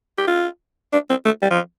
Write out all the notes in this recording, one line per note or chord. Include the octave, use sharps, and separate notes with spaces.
G4
F4
D4
C4
A3
G3
F3